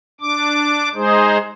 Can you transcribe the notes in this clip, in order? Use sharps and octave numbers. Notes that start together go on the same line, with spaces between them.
D4 D6
G#3 D#4 G#4 C5